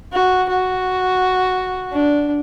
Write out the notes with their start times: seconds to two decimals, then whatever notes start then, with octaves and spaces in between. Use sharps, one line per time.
0.12 F#4
0.49 F#4
1.92 D4